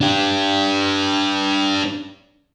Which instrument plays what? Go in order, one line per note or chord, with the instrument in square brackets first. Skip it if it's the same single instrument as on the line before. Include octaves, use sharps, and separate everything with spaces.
[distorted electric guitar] D4 G4